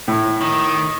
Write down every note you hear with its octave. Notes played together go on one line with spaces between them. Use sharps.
A2
D#3